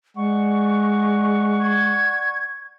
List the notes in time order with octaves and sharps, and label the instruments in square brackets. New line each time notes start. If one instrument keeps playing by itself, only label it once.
[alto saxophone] G#3 [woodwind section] D5 F#5 [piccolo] C#6
[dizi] G#6